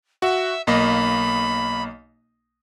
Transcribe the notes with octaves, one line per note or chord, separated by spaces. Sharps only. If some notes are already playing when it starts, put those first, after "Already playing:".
F#4 E5
B1 A#3 D#5 B5